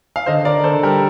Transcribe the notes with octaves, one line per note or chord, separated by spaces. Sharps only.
F5
D3 C5 D#5
D3 A#4 D5
D3 A4 C5
G3 G4 A#4